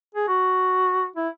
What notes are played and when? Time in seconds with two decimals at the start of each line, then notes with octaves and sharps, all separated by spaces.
0.14 G#4
0.28 F#4
1.16 E4